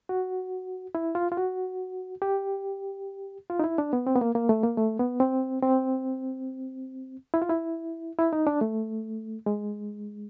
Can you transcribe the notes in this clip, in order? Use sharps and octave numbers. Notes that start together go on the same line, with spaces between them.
F#4
E4
F4
F4
F#4
G4
F4
D#4
E4
D4
B3
C4
B3
A#3
A#3
A3
A#3
A3
B3
C4
C4
E4
F4
E4
E4
D#4
D4
A3
G#3